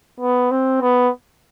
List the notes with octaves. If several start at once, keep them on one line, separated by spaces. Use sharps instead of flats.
B3
C4
B3